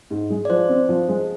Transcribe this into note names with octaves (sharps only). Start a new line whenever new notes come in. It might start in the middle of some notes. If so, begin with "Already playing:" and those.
G#2
G#3
D5
F3 C5
C4
F3
G#3